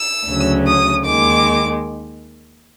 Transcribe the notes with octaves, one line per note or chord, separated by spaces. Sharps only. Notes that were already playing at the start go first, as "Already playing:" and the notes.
Already playing: E6
D2 C#3 F#3
D#6
D#2 D#3 G#3 D6